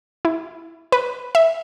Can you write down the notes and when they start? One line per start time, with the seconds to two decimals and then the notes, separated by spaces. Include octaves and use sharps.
0.25 E4
0.92 B4
1.35 E5